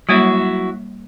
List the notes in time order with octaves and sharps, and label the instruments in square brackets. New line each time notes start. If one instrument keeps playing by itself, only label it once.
[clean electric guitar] F#3 E4 F#4 [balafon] G3 A#3 C#5